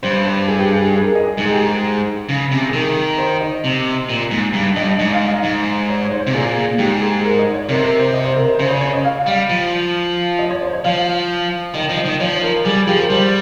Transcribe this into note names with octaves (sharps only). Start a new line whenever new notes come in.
G2 C5
C5
G#4
G4
G#4
G#4
G#4
A#4
D#5
G#4
G#2 G#4
G#4
G4
G#4
C#3
C3
G#4
D#3 A#4
C5
D#5
C3
A#2
G#2
G2
G2 D#5
G#2 D#5
F5
D#5
G#2
C#5
C#5
C5
C3
A#2 G#4
G#2 G4
G#4
A#4
D#5
C#5
C3 A#4
A#4
C5
D#5
C5
A#4
C5
C#3 C5
C#5
C#5
D#5
F5
G3
F3
D#5
C#5
C5
C#5
F3 F5
D#3 D#5
F3
D#5
D#3
F3 C#5
A#4
G3 G#4
G#4
F3 G4
A#4
G3 C5